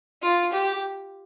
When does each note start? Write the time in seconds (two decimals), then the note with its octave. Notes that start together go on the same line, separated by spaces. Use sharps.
0.22 F4
0.53 G4